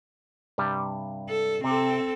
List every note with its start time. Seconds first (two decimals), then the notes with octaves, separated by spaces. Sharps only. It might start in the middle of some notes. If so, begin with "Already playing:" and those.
0.58 G2 C3 G3
1.30 A4
1.64 C3 C4 A4